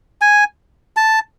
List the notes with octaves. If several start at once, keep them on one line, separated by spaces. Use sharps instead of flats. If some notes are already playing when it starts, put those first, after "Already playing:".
G#5
A5